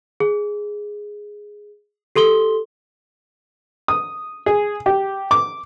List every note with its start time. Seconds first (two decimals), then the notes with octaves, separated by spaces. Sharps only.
0.20 G#4
2.16 G4 A4 C6 G7
3.88 D#6
4.46 G#4
4.86 G4
5.31 D6